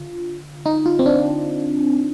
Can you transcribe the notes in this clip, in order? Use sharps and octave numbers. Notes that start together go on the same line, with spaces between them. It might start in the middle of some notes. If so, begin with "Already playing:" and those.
Already playing: D3 F4
D#4
F4
C4
D4